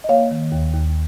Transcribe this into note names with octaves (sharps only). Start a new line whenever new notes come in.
D#5
A#3 C#5 F5
D#3
D#2
D#2